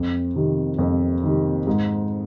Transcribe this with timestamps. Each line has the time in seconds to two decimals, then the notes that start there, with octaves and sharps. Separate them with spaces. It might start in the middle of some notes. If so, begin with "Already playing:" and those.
Already playing: F2
0.36 C3 D#3
0.79 F2
1.24 C3 D#3
1.67 G#2